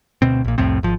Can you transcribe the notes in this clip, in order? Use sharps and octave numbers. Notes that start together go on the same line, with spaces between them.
D2 B2 C4
A#1 A#2
C2 F2 A2 C4
G#1 F3